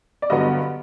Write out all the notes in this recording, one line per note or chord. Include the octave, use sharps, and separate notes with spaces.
D5
G2 D3 F#3 B3 D#5